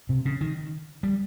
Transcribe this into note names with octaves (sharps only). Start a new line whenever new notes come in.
C3
C#3
D#3
G3